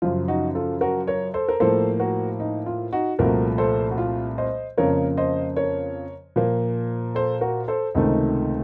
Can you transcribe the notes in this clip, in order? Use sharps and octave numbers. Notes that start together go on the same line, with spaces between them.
F#2 C#3 F3 F4
D#4 F#4
F4 A4
F#4 A#4
A#4 C#5
A4 C5
A#4
A2 F3 A#3 A4 C5
F#4 A#4
D#4
F4
D#4 F#4
C2 A#2 F3 A3 F#4 A#4
A4 C5
F#4
F4
C5 D#5
F2 C#3 F3 A#3 A#4 C#5
C5 D#5
A#4 C#5
A#2 F3 A#3
A4 C5
F#4 A#4
A4 C5
C#2 C3 D#3 A3 D#4